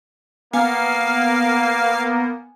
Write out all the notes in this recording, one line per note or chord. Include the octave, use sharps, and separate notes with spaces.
A#3 B3 F5 G#5